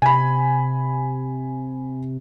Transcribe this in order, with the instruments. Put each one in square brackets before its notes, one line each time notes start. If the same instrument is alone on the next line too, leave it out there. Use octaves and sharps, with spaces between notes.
[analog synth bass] C3 [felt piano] G#5 B5